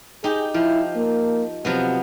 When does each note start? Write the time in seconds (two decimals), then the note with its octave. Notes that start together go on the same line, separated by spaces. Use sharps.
0.24 D#4 G4 G#4
0.54 F3 E4
0.96 A#3
1.65 C3 F3 F#3 B3